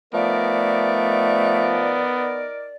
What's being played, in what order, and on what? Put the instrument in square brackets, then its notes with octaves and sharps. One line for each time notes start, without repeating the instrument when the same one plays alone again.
[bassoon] F3 [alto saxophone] A3 [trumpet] B3 [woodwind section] D#4 A#4 D5